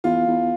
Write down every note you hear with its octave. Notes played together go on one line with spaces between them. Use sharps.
E2 F4
E2